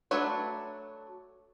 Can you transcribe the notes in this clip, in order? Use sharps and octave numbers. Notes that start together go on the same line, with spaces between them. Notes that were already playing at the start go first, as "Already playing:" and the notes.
F#3 A3 D4 B4 C#5